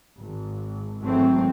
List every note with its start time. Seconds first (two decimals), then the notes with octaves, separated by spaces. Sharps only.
0.20 G#1
1.01 G#1 E3 F#3 G#3 A3 C4